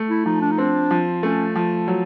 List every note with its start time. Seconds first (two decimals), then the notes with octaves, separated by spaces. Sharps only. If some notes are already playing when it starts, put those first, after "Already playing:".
Already playing: A3
0.10 E4
0.25 F3 D#4
0.41 D4
0.51 D#4
0.58 C4 D4
0.91 F3
1.23 A3 C#4
1.55 F3
1.88 F#3